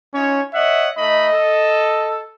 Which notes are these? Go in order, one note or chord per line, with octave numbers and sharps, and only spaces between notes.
C#4 D#4 F4 C#5
C#5 D#5 E5 F#5
A3 D#4 D#5 B5
A4